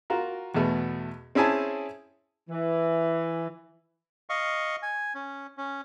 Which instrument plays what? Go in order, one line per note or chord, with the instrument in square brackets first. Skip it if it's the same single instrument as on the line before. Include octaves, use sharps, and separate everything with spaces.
[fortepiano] F4 F#4 A#4
E2 B2 A3 B3
C4 C#4 E4 G#4 G#5 A5
[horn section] E3
[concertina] D#5 F5 C#6
G#5
C#4
C#4